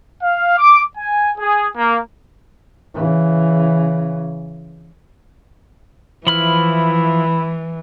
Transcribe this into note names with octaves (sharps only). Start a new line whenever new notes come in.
F5
D6
G#5
G#4
A#3
C#3 E3
E3 F3 E4 B5 F6